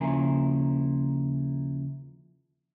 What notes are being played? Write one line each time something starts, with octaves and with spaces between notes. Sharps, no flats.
D#2 C#3 F3 E4 A#4 G#5